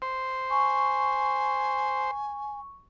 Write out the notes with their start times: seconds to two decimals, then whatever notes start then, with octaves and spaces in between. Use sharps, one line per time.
0.02 C5
0.50 G#5 C#6